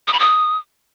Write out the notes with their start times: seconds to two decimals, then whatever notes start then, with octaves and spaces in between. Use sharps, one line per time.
0.08 D#6
0.13 B5
0.19 D#6